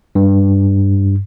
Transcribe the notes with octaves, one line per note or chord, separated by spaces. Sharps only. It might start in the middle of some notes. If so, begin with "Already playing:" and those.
G2